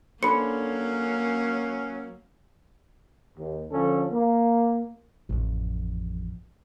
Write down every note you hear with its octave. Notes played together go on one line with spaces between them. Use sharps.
F#3 A#3 C#4 D4 A4 C5 B5 C#7
D#2
D3 F3 C#4 A4
A#3
A1 F2